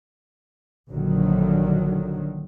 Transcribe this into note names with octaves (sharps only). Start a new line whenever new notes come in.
A#1 D3 D#3 F#3